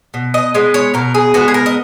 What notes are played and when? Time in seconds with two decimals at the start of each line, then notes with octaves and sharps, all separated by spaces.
0.14 B2
0.34 D#5
0.54 G#3 B3 D#5
0.74 C#5
0.94 B2 A#4
1.14 G#4
1.34 G#3 B3 F#4
1.48 G#4
1.54 A#4
1.66 D#5